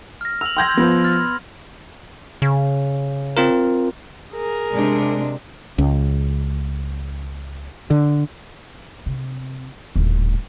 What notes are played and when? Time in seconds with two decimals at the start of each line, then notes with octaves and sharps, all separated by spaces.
0.21 F6 A#6
0.41 E6 F7 F#7
0.57 G5 C6 E6 G6 G#6 A#6
0.77 F3 B3
1.04 F6 A6
2.42 C#3
3.37 C4 F4 A#4
4.33 G#4 A#4
4.74 C3 G#3 D4
5.78 C#2
7.90 D3
9.06 C3
9.96 D#1 A2